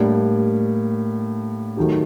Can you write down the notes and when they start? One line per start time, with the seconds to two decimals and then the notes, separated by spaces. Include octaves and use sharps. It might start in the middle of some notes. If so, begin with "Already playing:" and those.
Already playing: A2 G3 A#3 D4
1.77 D#3 F#3 A3 D#4 G4